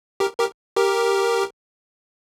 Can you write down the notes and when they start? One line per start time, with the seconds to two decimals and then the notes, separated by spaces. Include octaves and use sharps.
0.20 G4 A#4
0.39 G4 A#4
0.76 G4 A#4